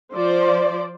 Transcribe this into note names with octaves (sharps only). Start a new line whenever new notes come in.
F3 C5 D5